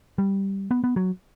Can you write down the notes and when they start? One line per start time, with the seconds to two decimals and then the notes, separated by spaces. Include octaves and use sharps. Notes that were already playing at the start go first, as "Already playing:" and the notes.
0.18 G3
0.71 B3
0.84 B3
0.96 F#3